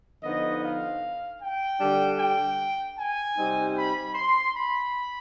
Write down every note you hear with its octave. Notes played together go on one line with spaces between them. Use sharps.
D3 F3 B3 D#4 D#5
F5
G5
D3 G3 D4
G5
G#5
C3 G3 C4 D#4
B5
C6
B5